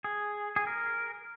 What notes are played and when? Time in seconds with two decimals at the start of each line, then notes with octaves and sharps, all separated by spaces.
0.04 G#4
0.56 G#4
0.67 A#4